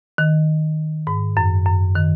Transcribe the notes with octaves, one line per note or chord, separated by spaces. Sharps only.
D#3
G#2
F#2
F#2
D#3